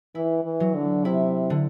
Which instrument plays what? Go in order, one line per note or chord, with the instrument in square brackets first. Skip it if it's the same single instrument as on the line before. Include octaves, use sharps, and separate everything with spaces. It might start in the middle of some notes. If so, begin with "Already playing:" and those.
[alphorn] E3 [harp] E4
[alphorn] E3
[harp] F#3
[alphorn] D3
[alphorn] C3 [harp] E4
[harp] D3